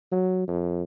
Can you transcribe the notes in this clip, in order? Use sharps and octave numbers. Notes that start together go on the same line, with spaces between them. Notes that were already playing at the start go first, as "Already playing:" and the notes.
F#3
F2